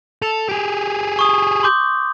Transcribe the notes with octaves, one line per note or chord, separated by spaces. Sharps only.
A4 F7
G4 G#4
C#6 D#6
C6 D6 G6